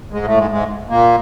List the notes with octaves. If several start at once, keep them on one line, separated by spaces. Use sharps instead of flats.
G#2 G#3
A2 A3
G#2 G#3
G#2 G#3
A#2 A#3